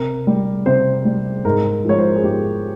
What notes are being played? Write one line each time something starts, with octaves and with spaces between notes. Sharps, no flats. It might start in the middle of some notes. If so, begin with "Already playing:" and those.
Already playing: C3 A#4
G3
C3 C5
G3
G#2 A#4
F3 G#3 C#5
C5
A#4
G#4
G#2 G4